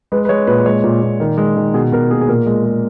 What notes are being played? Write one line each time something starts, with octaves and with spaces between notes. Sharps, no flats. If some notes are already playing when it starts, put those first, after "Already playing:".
G#3 B4
B4
G#3 C#5
A#2 B4
G#3 C#5
A#2
A#2
D#3
G#3
D#3
B2 G#4
B2 A#4
A#3 G#4
G#4
A#2 A#4
G#3
G#3